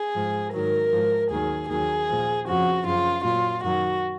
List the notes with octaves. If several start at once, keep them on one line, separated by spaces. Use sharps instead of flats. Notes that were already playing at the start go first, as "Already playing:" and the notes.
Already playing: G#4
G#2 F3
G#2 D#3 F#3 A#4
G#2 F3
D#2 D#3 F#3 G#4
D#2 D#3 F#3 G#4
A#2 F3
F2 C#3 F3 F#4
F#2 C#3 F3 F4
A#2 F#3 F4
F#2 D#3 F#3 F#4